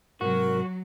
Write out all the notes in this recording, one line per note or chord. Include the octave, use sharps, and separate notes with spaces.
G#2 C3 F#3 F#4 A#4